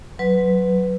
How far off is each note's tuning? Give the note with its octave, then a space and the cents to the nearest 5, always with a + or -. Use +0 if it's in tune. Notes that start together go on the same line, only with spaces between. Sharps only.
F#3 +0 B4 +5